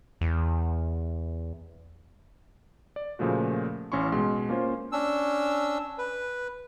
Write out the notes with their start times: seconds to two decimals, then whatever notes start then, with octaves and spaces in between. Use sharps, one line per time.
0.21 E2
2.96 D5
3.19 A#2 C#3 F3 A3 F#4
3.92 A1 C#4 E4 C6 C#6
4.12 B2 G#3 C6
4.49 A#3 C#4 F4 C5
4.92 C#4 D4 E6
5.98 B4